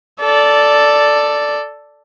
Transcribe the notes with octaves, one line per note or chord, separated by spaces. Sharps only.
A4 D5